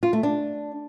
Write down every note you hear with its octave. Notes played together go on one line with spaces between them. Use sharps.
F4
A3
D4